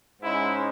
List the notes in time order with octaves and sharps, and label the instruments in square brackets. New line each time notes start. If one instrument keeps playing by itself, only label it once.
[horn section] G#2 G#3 C#4 E4